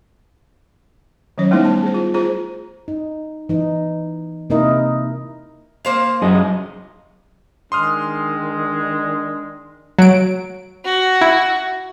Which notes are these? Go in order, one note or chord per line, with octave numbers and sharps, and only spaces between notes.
D#3 F#3 C#4 C#5
G3 A3 B3 D#4 E4 C5
A5
G#4 C5
F4
F4 G#4 C5 A#5
D#4
E3 D#4
C3 A#3 D#4 E4 A#4 D#5
A#3 C5 F5
F#2 G#4 D#5
D#3 G#3 D4 C6 D#6 F6
F#3 D7
F#4
E4